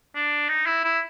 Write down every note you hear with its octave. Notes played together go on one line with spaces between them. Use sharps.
D4
D#4
E4
E4